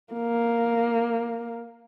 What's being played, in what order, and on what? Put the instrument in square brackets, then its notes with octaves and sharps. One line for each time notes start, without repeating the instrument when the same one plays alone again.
[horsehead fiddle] A#3